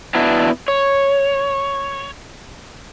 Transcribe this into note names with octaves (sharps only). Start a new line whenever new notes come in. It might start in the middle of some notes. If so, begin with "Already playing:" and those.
B3 D4 E4 F#4
C#5